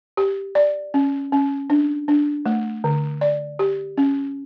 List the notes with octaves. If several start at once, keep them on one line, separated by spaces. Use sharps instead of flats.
G4
D5
C#4
C#4
D4
D4
A3
D3
D5
G4
C#4